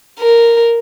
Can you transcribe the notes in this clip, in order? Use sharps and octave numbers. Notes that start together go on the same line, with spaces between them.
A#4